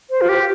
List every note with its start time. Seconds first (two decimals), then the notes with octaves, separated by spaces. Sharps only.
0.10 C5
0.21 F4
0.29 G4